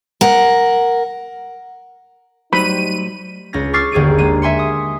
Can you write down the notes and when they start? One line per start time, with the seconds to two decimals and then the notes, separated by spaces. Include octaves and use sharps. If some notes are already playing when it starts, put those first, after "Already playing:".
0.21 A#4 F#5
2.53 A2 F#3 G3 D#4 C5 B5 D#7
3.53 C#2 C#4 A#6
3.73 C#6 D6 E6 F6 A6 C7
3.92 G1 D#2 G#4 D7 D#7
4.18 G#3 A#3 D#7
4.42 E5 G#5 C6 C#7
4.59 D#6